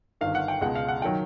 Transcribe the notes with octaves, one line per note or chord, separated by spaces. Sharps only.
G1 G2 D#3 F5
F#5
G5
C#2 B2 G#3 F#5
F5
F#5
D#3 F#3 G5